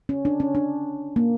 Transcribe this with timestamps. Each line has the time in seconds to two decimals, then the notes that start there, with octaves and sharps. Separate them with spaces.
0.09 C#4
0.25 D4
0.40 C#4
0.55 D4
1.16 A#3